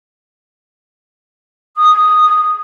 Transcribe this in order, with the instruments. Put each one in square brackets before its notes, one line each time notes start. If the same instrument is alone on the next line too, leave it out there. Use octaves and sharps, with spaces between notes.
[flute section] D#6